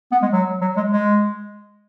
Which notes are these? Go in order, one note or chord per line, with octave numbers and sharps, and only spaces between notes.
B3
G#3
F#3
F#3
G#3
G#3